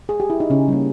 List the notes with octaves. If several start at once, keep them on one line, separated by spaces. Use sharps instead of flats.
G#4
G4
E4
D#4
C#3 C#4
G3 A#3